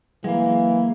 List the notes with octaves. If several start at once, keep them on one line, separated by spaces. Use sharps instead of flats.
E3 F#3 G#3 A#3 F5